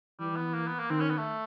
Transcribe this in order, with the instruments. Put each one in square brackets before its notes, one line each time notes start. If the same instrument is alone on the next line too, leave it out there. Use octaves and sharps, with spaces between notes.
[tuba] E3 [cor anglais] G3
[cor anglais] B3
A#3
B3
A#3
[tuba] D#3 [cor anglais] C4
[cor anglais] C#4
B3
A3